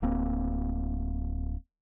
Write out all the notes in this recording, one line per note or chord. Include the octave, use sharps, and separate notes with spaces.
D1 A#3 C4